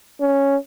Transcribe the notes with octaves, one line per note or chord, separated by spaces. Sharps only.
C#4